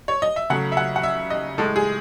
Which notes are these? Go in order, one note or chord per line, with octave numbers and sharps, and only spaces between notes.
C#5
D#5
E5
C#3 F#3 A3 F#5
E5
F#5
F#5
E5
D#5
A2 G#3 A4
G#4